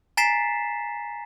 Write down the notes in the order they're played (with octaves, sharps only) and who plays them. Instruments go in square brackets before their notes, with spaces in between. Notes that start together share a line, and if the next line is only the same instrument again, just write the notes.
[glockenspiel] G#5 A#5 A6 B6 C7 E7